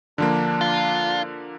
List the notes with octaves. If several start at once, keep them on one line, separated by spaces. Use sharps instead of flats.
D3 F3 A#3 D4
F4